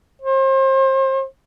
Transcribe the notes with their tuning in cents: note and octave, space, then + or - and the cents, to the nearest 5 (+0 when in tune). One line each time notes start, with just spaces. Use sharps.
C5 +35